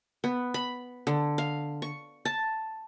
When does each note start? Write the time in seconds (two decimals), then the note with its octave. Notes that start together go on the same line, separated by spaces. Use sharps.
0.24 B3
0.54 B5
1.07 D3
1.38 F5
1.82 C#6
2.25 A5